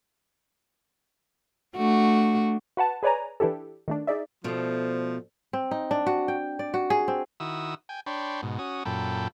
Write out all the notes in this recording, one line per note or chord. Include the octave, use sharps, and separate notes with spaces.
A3 D4 F#4
F#4 B4 F#5 A5
G#4 B4 C#5 D5 G#5 A#5
E3 D4 E4 G4 A4
D#3 A3 D4
D#4 G#4 D5 E5
B2 F3 A3 C5 D5
C4
D#4
D4
F#4
G5
D5
F#4
G#4
C4
D#3 E4 F#4 D#6 E6
G5 G#5
D4 C#5 G5 B5 C6
G#2 B2
C#4 F#4 D#6
F#2 A#2 A4 G5 B5